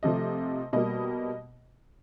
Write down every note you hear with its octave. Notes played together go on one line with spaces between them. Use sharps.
C3 F3 A3 D#5
B2 G3 A#3 D#5